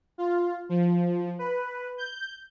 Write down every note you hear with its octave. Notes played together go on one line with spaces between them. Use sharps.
F4
F3
B4
G6